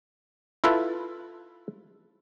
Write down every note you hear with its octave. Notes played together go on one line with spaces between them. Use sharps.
E4 F4 A4 B4